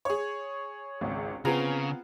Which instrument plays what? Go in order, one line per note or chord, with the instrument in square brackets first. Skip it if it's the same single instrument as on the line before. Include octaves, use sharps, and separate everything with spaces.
[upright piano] G#4 C#5
[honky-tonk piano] G#1 C#2
[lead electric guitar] C#3 [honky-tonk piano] B3 C4 F4 [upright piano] G#4 A#5